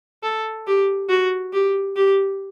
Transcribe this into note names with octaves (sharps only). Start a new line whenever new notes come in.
A4
G4
F#4
G4
G4